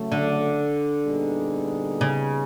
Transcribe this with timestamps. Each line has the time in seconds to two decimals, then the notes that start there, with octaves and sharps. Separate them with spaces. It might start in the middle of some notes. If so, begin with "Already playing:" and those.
Already playing: C#3 F#3 A3
0.12 D3
1.06 A#2 G3 B3 D#4 G#4
2.01 C#3